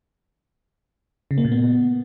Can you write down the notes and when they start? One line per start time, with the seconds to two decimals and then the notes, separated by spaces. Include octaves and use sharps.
1.31 C#3
1.38 A#3
1.45 A#2
1.52 B3